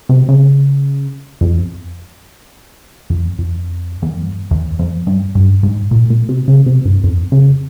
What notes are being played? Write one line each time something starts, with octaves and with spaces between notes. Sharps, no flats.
C3
C#3
F2
F2
F2
E2
F2
G2
E2
F2
G2
G2
G#2
A#2
A#2
C3
C#3
C3
G2
F2
C#3